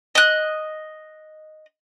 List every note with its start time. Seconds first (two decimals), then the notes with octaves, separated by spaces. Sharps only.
0.15 D#5 F#6